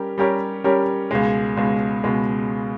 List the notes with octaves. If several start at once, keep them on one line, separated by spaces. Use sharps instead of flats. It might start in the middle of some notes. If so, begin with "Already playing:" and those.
Already playing: G3 C#4 G4 A#4
G3 C#4 G4 A#4 C#5
G3 C#4 G4 A#4 C#5
C#2 B2 G#3
C#2 B2 G#3
C#2 B2 G#3